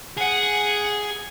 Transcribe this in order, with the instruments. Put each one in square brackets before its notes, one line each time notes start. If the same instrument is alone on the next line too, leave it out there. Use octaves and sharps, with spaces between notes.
[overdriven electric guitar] G#4 [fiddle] F#5